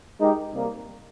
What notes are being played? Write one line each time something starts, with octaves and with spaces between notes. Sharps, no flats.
G#3 D#4 G4 A#4
C3 G3 A#3